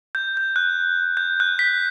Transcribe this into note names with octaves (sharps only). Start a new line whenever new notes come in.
G6
G6
F#6
G6
F#6
B6